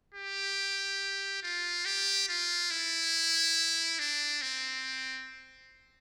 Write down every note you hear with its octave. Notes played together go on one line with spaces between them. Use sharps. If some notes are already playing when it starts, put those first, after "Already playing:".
G4
F4
G4
F4
E4
D4
C4